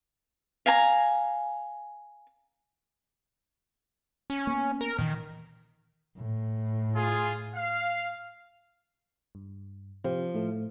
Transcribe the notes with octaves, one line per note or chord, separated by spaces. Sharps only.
F5 G#5 A#5
C#4
A#3 B3
A#4
A#2 D#3 E3
A2
F4 G#4
F5
G2
C3 F3 G4
A2 A3